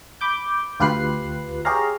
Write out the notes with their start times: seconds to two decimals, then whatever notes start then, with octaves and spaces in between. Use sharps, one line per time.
0.21 B5 D6 G6
0.80 D2 F4 G4 B4 F#6 C7
1.65 G4 G#4 C#5 F5 A#5